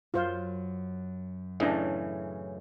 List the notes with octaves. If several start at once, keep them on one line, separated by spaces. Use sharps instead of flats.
F#2 F4 C5 F5
A2 C#3 E3 C#4 D4 D#5